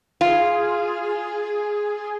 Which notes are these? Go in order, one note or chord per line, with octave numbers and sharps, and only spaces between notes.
F4 G#4